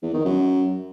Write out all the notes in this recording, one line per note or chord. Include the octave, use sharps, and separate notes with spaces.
E2
D#3
F#2